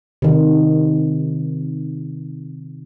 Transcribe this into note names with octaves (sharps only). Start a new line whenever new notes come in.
C3 D#3